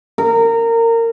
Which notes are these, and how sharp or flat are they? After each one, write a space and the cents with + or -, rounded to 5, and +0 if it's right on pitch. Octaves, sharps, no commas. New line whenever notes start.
A#4 -25